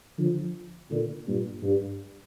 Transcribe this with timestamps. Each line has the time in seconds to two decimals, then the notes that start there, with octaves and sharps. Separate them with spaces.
0.18 D3 F3
0.90 A#2 D3
1.26 G2 A#2
1.63 G2